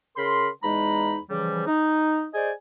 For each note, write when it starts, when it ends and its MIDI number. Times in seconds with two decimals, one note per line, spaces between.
0.17 0.48 49
0.17 0.48 70
0.17 0.48 83
0.17 0.48 84
0.63 1.18 40
0.63 1.18 56
0.63 1.18 63
0.63 1.18 82
0.63 1.18 83
1.30 1.65 49
1.30 1.65 52
1.30 1.65 53
1.30 1.65 55
1.67 2.25 63
2.34 2.51 68
2.34 2.51 72
2.34 2.51 74
2.34 2.51 75
2.34 2.51 80